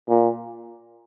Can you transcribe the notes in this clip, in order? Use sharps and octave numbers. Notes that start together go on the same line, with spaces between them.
A#2